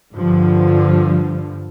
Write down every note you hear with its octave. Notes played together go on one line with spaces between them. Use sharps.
G2 D3 F3